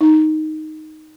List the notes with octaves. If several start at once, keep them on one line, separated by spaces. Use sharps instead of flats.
D#4